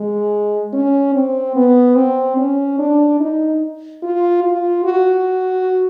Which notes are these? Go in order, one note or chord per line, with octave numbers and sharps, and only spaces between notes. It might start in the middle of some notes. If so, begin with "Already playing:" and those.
Already playing: G#3
C#4
C4
B3
C4
C#4
D4
D#4
F4
F4
F#4